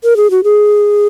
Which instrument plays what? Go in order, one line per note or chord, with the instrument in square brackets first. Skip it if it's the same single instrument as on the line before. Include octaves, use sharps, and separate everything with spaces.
[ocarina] A#4
G#4
F#4
G#4